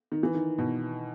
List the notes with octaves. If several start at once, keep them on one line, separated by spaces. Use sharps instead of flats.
D#3
E3
D#3
B2